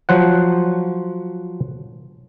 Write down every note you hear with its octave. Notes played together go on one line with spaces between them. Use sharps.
F3 F#3 C5 F#5